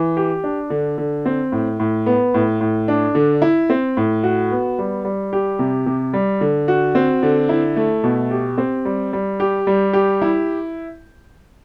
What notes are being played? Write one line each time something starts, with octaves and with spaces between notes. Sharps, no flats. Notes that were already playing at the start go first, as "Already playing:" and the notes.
Already playing: E3
G4
D4
D3
D3
C4
A2
A2
B3
A2
A2
D4
D3
E4
C4
A2
F#4
B3
G3
G3
G4
C3
C3
G3
D3
F#4
C4
D3
E4
A3
B2
G4
C4
G3
G3
G4
G3
G4
E4